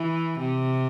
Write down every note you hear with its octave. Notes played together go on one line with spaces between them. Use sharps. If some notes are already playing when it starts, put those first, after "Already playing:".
Already playing: E3
C3